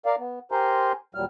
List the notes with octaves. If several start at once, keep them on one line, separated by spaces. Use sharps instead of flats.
A#4 D5 F5
B3
G4 A#4 C5 G#5 A#5 C6
D#2 A#2 F#3 G3 F6